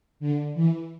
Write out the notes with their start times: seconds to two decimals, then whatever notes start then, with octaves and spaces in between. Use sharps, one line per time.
0.20 D3
0.54 E3